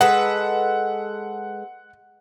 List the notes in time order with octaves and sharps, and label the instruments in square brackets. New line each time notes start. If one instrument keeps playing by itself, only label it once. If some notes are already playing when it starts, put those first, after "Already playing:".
[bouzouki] G#3 A4 B4 [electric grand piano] F#5